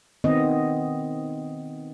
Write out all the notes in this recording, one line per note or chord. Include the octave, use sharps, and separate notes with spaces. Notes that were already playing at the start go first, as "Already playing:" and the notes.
D#3 B3 C4 D#5